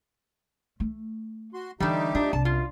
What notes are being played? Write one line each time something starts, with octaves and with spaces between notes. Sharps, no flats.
A3
F#4 C6
D3 E3 G3 A3 D#4 G4
D4 F4
C2 A5
F#2 F4